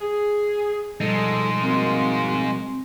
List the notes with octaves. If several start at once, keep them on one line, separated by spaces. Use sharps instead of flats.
G#4
B2 F3 G3 G#3 D#4 A4
A#3 C4 F#4